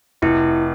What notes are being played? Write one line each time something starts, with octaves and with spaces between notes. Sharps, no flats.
F1 E4